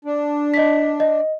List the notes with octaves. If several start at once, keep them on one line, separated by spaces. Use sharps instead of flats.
D4
D#5 B6
D#5